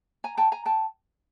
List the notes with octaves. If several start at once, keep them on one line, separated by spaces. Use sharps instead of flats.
G#5 A#5
G5 A5
G#5 A#5
G5 A5